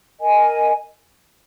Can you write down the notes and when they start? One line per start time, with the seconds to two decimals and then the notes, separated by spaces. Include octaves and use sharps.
0.20 A#4 D#5 G#5